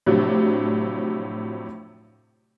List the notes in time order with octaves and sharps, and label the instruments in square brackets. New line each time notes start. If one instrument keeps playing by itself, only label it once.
[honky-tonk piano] A2 C3 F3 F#3 D4